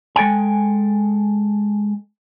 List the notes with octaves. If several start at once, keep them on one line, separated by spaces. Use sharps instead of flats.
G#3 A4 G5 G#5